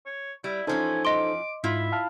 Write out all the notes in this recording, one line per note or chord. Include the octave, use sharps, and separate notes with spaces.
C#5
G3 E4
E3 F3 C#4 D#4 A4 C5 G#5
D#5 C6 D6
G#2 E4 F4 E5
F5 A5 F6